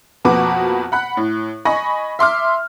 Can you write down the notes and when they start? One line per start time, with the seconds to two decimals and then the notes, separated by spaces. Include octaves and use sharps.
0.25 F2 B2 A#3 F#4 B4 D6
0.92 F#5 B5 F#6
1.17 A2
1.65 D#5 G#5 B5 C#6 A#6
2.19 E5 C6 D6 F6